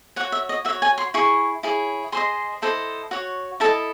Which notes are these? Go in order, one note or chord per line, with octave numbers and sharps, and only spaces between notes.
F#4 C#5 F#5
E5
D#5
F#4 E5
C#5
G#5
C6
E4 G#4 C#6
E4 G#4 C#5
G#4 C5 D#5 C6
E4 A4 C5 D#5
F#4 C#5
E4 A4 D#5 A5